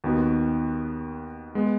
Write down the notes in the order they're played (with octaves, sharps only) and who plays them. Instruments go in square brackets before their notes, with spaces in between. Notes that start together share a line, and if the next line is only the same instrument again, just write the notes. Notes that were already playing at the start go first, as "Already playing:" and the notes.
[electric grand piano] D#2 D#3 B3 F#4
G#3 B3